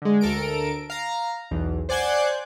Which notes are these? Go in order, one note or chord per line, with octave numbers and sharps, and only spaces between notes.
D3 G#3
D2 A4 A#4 D7
F5 A#5
B1 E2
C5 D5 F#5 G#5 F#6 G6